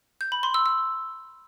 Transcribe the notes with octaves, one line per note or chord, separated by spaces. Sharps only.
G6
B5
C6
E6
E6